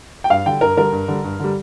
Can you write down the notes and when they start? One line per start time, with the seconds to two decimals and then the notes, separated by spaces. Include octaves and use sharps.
0.24 G5
0.30 G2 F5
0.45 D3 G3 G5
0.61 G2 A#4
0.77 D3 G3 A#4
0.92 G2
1.08 D3 G3
1.24 G2
1.40 D3 G3